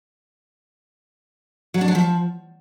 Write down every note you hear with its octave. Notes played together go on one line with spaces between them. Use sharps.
F#3
D4
F#3
F3